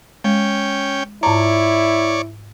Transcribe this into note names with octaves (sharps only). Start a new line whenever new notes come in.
G#3 C#4 G5
G#2 E4 C#5 D5 A#5